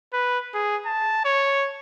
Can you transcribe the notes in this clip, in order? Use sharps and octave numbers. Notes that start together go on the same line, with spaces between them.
B4
G#4
A5
C#5